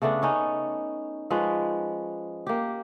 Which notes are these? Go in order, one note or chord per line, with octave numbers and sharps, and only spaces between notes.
C#3 A3 B3 D4
C#4 D#4 C#5
F3 G#3 C#4 B4
A#3 G4